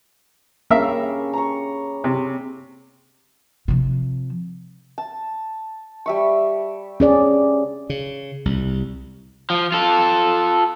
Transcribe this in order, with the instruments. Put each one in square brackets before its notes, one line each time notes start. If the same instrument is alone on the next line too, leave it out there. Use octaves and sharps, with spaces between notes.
[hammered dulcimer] C#3 G3 D4 [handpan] A#3 [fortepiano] A#4 E5 F5
[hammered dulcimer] A#5 C#6
[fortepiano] C3
[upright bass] C3 F3
[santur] A5
G3 E5 C#6
[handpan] C#4 G#4 D5
[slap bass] C#3
C2
[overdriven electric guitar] F3
F4 A4